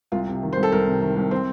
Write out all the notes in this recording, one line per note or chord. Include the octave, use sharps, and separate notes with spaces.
C2 F4
C3
D#3
C5
C2
A4
C2 A#4
C3
D#3
C2
C4